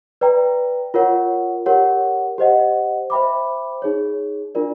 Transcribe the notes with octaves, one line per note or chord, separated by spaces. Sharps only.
B4 D5 G5 A#5
F4 A#4 C#5 F#5
G4 A#4 C#5 F#5
G4 C5 D#5 F#5
C5 E5 G5 B5 D6
D#4 G#4 C#5
D4 F4 A#4 D5